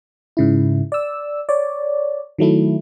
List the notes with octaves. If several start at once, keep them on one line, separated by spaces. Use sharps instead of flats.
G#2 C#3 E4
D5 E6
C#5 D5
D#3 F#3 A3 E4